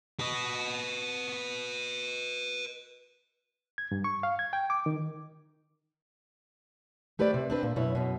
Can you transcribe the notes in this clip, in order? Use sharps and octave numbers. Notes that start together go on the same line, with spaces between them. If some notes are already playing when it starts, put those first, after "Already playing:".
B4 D#5
G#6
G2
C#6
F5
G#6
G5
D6
D#3
A3 G4 B4 C5 D5
C3
C4 D4 B4
A#2
F#2 B2 E4 C#5
F#2 B2